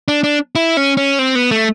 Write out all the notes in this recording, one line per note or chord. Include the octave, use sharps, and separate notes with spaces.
D4
D4
E4
C#4
C#4
C4
B3
A3